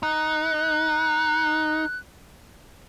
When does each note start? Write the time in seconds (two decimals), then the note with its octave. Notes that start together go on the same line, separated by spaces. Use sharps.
0.03 D#4 F#6